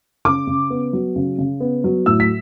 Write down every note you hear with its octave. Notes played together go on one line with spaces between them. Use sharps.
C#3 D6
C#3
B3
F#3
C#3
C#3
B3
F#3
A2 E6
B6